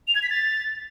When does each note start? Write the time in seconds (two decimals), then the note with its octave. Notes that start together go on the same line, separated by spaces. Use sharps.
0.08 F7
0.15 G#6
0.22 B6
0.30 A6